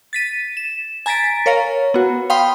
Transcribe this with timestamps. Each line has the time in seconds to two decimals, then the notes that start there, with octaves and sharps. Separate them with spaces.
0.13 A6 B6 D#7
0.57 E7
1.06 G#5 A#5 A6 B6 D7
1.46 A#4 C#5 F5 A#5
1.94 B3 F#4
2.30 F5 G5 B5 C6 D#6